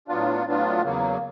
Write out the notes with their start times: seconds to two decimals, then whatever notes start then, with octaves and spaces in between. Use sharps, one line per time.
0.08 A2 F#3 B3 D4 F4
0.45 A2 F#3 B3 D4 F4
0.83 E2 C#3 F#3 A#3